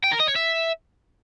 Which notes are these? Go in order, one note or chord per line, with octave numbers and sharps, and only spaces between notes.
G5
A#4
D#5
C#5
E5